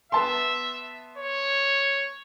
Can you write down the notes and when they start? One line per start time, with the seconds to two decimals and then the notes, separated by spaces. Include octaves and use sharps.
0.12 B3 E5 A5 C6
1.18 C#5